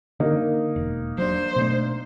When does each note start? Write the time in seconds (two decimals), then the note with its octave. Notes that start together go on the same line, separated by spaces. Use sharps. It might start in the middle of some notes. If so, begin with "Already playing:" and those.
0.20 D3 A#3 D#4
0.76 E1
1.18 F#3 D4 C5
1.56 B2 A3 D4